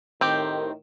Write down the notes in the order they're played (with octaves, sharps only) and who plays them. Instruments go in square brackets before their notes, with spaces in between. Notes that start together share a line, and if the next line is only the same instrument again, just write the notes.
[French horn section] A2 D#3 [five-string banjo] C4 G4